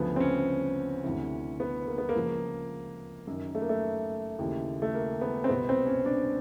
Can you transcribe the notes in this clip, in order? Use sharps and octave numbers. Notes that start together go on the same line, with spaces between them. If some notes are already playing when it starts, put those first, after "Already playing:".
Already playing: D2 C#3 F3 B3
C4
C#4
D2 C3 E3
B3
A#3
B3
A#3
C#2 C#3 F3
F#2 D#3
A3
A#3
A3
D#2 C#3 E3
A3
A#3
B3
C4
C2 B2 B3
C4
C#4
D4